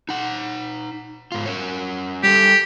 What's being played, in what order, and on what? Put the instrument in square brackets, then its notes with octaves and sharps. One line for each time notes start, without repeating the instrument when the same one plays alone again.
[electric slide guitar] D#4 F#5
G#2 F4
C#4 A#4 C#5
[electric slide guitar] G3 A4 [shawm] G4